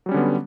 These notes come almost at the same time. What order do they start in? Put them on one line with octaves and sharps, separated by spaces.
F#3 G3 C#4 D3 B3